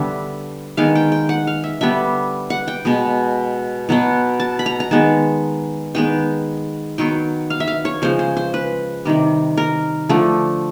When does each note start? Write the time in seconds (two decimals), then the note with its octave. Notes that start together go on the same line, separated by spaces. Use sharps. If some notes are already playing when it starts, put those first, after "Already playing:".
Already playing: D3 G3 B3 E5
0.77 D#3 G#3 B3 F5
0.95 G5
1.12 G5
1.29 F#5
1.47 F5
1.64 E5
1.81 D3 G3 B3 E5
2.50 F#5
2.68 G5
2.85 B2 G#3 B3
3.89 B2 F#3 B3
4.40 A5
4.59 B5
4.66 A#5
4.80 A#5
4.91 D#3 G#3 B3 A5
5.95 D#3 G#3 B3 G5
6.98 D#3 F#3 B3 G5
7.50 F5
7.60 E5
7.68 F5
7.85 C#5
8.02 C#3 F3 G#3 C5
8.19 C5
8.37 C5
8.54 B4
9.05 C3 D#3 G3
9.57 A#4
10.09 D3 F3 A3